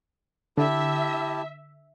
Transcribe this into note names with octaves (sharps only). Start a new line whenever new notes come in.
D3 E4 G4 E5 A5